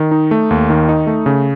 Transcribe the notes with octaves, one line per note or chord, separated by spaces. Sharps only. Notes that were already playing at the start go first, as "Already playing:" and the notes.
Already playing: D#3
D#4
A3
D#2
D#3
D#4
A3
C#3